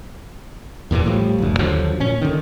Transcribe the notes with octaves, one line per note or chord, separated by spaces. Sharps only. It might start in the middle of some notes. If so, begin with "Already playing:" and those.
E2 A#2 C#3 E3
A2 F3 G3
F#1 D2
D#2 D3 F3 F#3
A#2 C#4
D3 D#3